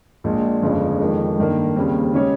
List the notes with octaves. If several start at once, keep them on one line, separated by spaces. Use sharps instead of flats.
A#1 A#2 G#3
G1 F2 C#3 G#3
F2 D#3 G#3
G2 D#3 A#3
D#2 C#3 G3 C4
C#3 G#3 C#4 G4 C#5